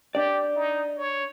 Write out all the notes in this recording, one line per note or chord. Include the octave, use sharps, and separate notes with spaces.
D4 G4 D5
D#4
C#5